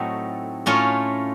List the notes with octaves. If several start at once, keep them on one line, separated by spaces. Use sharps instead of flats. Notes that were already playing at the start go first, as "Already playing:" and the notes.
Already playing: A2 F#3 A3 C4 D#4
A2 A3 C#4 F4